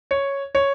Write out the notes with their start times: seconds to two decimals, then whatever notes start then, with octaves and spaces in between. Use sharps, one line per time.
0.11 C#5
0.55 C#5